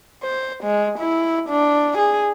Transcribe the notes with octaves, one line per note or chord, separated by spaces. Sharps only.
C5
G#3
E4
D4
G#4